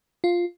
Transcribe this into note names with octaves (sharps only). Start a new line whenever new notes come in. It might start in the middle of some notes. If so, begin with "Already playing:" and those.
F4